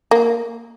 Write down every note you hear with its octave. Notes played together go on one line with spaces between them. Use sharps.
A#3